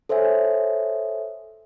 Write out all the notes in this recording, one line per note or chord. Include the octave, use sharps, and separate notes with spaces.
A4 C5 C#5 E5 G#5